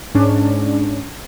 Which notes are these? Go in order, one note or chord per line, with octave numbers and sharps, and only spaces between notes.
G#2 C#4 D4